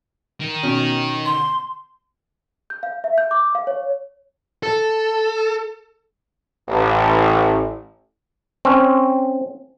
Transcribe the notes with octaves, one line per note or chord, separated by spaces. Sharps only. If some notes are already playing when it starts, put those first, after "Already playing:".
D#3
B2 C#4
C6
G6
F5
E5
G6
D6
F5
C#5
A4
A1
C4 C#4